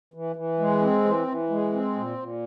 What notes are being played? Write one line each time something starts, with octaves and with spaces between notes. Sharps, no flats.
E3
E3
G#3
C4
E3
E3
G#3
C4
A#2
A#2